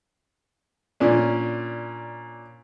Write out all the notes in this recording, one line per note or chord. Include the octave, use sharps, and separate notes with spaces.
A#2 C#4 D4